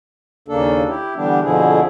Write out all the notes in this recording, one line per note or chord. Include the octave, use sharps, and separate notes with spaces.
D#2 C#3 A#3 D4 A4
E4 G4
D3 E3 G3 B3 D4 G4
F2 B2 D3 F3 E4 G#4